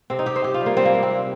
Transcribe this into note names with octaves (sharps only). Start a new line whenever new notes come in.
C3 C4
D#4
C3 G4
C5
C3 G4
F4
G3
A#3
G3 C4
A#3
C3
C4
G3